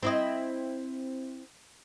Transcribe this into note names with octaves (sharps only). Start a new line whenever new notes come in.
C4 E4 D#5